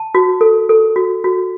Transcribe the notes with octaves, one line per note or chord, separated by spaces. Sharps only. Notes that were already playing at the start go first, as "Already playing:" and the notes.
Already playing: A5
F#4
A4
A4
F#4
F#4